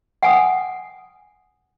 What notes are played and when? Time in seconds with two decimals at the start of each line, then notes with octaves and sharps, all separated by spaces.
0.23 F#5 G#5 D#6